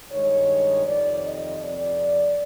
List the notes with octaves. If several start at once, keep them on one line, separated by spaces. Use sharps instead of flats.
G2 D#3 G#3 C#5
F2 C3 D#3 D5
D#5
F2 C3 F3 D5